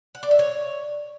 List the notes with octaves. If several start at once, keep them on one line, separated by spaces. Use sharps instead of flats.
F#5
D5
E5
C#5